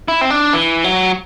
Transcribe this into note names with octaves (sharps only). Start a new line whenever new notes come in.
E4
C4
D4
E3
F#3